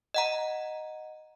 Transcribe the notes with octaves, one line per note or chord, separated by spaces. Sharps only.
D#5 F#5 A#5